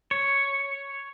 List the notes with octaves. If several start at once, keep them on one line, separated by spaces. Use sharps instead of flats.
C#5